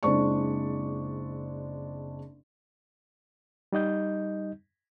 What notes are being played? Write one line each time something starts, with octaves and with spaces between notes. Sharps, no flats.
F#1 G#3 C4 D4 D5 C#6
G3 D#4 D#5 G6